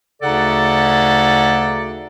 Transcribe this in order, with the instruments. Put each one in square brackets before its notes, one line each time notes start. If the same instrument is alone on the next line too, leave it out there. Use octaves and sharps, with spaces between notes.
[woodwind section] D2 C#3 D#4 A4 D5 F#5